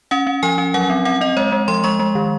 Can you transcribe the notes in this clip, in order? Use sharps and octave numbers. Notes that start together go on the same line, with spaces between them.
C#4 F#5
C#4
F3 G#5
C#4
F#3 F#5
C4
C4 F#5
C4 D#5
G#3 C#5
G#3
F3 C6
G#3 C#6
G#3
D#3